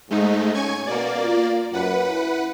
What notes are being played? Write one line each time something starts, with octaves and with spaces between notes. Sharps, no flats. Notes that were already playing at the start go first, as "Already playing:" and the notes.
G#2 G#3 A3 D#4
C#4 G#5 C#6 G#6
B2 A#3 D5
F4
F#2 B4 F#5
E4